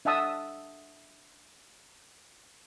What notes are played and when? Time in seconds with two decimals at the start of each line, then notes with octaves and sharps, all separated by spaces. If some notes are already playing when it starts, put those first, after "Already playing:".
0.05 D4 E5 F#5 A5 D#6 E6